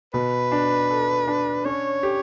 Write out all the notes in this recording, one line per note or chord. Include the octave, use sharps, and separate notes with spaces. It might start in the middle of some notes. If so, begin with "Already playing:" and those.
B2 B4
D4
A4
D4
C#4 C#5
G4